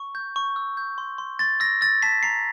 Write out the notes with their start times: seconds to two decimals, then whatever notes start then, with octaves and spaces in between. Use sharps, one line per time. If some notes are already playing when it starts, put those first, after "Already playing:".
Already playing: C#6
0.15 G6
0.36 C#6
0.56 E6
0.77 G6
0.98 C6
1.18 C6
1.39 C6 A6
1.60 E6 A#6
1.81 E6 A6
2.02 A5 B6
2.23 A#5 C7